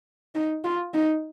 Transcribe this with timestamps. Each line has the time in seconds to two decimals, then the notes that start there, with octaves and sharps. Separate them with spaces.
0.35 D#4
0.64 F4
0.94 D#4